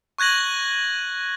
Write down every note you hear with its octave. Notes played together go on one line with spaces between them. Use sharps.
C#6 F#6 G#6 A#6 F#7